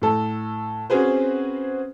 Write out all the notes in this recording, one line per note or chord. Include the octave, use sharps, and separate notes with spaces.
A2 A4
C4 C#4 F#4 G#4 B4 C5